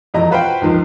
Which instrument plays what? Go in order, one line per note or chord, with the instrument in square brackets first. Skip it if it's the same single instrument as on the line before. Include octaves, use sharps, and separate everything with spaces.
[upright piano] E1 F2 E4 D#5 A#5
F4 F#4 B4 C5 F5 G5
C#2 D#3 F3